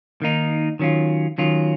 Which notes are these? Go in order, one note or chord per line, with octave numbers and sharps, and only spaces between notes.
D#3 A#3 D#4
D#3 F#3 C#4 F4
D#3 F#3 C#4 F4